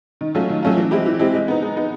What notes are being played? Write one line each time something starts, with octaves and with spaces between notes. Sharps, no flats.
D#3
F#3 A3 C#4 F4
D#3
F#3 A3 C#4 F4
E3
G#3 C4 E4 G4
E3
G#3 C4 E4 G4
G#3
B3 D#4
G#3
B3 D#4